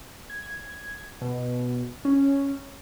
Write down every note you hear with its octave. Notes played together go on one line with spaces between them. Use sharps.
G#6
B2
C#4